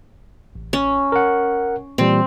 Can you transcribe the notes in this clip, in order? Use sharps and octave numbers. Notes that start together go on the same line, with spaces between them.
A1
C#4
A#4 F#5
A#2 E3 G3 C4